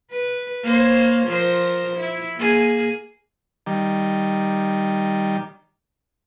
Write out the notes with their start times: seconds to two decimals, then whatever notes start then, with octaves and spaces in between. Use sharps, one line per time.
0.11 B4
0.64 A#3 C5 C#5
1.26 F3 A#4 C5
1.96 E4
2.36 A#3 G#4
3.66 D#3 G3